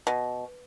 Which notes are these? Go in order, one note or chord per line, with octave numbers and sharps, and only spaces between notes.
B2